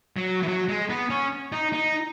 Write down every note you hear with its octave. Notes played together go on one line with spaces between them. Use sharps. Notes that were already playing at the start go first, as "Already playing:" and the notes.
F#3
E3
F#3
G#3
B3
C#4
D#4
D#4